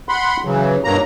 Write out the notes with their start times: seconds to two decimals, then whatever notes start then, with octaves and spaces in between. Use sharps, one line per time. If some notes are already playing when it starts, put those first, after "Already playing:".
0.09 F#5 B5 C6
0.45 C#3 E3 F#3
0.84 G2 B2 F#3 A#3 A#5